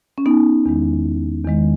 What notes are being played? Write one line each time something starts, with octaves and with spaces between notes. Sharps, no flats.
C#4
B3 D#4
E2 D#3 G#3
E2 D#3 G#3